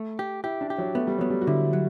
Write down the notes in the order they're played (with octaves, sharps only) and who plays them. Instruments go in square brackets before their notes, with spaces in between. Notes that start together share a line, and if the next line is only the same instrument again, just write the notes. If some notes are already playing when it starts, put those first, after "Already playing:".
Already playing: [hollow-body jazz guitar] A3
G4
[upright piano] E4 [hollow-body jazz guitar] G4
[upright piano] D4
[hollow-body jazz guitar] G4
[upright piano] F#3
[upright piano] A3 [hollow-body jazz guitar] B3
[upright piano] G3
[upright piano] F#3 [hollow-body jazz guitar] B3
[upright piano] G3
F#4
[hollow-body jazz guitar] D3 [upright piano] E4
[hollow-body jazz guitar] F#3